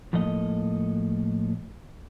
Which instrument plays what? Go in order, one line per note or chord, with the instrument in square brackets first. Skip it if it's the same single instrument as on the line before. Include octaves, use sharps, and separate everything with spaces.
[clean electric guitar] A2 F3 A#3 A4 D#5